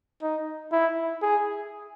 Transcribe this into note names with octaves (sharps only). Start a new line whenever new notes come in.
D#4
E4
G#4